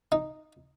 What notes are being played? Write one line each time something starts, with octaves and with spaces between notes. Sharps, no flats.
D#4